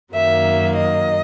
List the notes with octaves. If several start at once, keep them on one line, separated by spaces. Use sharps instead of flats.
F#2 D#3 F#3 A#3 E5
D#5